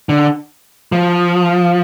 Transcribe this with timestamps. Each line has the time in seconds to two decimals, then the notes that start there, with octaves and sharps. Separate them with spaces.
0.09 D3
0.92 F3